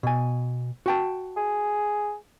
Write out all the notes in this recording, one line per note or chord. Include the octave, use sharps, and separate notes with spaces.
B2 G#5
F#4 G5 A5
G#4